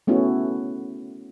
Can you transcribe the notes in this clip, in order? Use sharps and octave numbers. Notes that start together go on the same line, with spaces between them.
A3 B3 C#4 E4 F#4